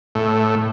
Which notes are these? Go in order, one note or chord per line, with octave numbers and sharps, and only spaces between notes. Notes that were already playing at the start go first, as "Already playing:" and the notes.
A2